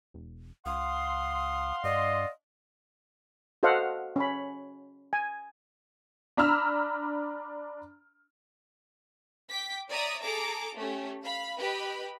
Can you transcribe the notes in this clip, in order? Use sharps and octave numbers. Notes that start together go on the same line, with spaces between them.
E1
C#2 F5 F#5 C6 D#6
G2 D5 D#5
F#4 A4 C5 D#5 F5 F#5
C#4 C#5 B5
G#5
D4 A#5 B5 E6 F6
G5 D6 B6
C#5 D5 E5 A#5 D#6
G#4 A4 A#5 D6
A3 C#4 G4
F5 B5
G4 B4 D#5 B5